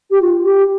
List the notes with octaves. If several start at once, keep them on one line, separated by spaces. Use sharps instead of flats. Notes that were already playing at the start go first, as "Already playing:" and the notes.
G4
F4
G4